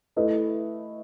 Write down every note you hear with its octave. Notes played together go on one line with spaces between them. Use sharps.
A3 E4 B4 D#5